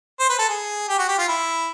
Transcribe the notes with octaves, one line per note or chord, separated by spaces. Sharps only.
C5
B4
A4
G#4
G4
F#4
G4
F4
E4